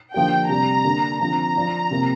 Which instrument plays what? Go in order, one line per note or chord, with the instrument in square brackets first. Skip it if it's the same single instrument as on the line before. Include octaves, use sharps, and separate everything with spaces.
[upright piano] D3 F3 A#3 G4 [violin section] G5
[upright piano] C3 G3 D4 [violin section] A#5
[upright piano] D3 A#3 G4
[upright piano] D3 F3 C4 F4 [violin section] A#5
[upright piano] F3 D4 F4
C3 A#3 F4